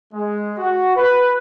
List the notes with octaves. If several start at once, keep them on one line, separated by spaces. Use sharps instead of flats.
G#3
F#4
B4